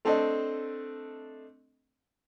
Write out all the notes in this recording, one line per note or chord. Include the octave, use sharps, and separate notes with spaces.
A3 C4 D4 A4 D#5